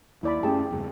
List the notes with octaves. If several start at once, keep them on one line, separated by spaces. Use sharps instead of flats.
D#2 E4 D5 B5
F#2 A3 C#4 G4 G#4 A5
E2 G2 C#3